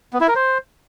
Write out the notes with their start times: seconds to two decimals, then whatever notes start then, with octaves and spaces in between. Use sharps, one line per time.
0.13 B3
0.21 E4
0.28 A#4
0.35 C5